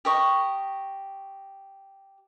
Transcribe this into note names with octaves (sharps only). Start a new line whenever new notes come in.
G4 A#4 D#5 C#6